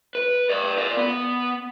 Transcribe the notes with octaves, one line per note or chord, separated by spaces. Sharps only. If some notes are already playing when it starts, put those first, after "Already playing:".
B4
B4 D5
A#4 D5
B3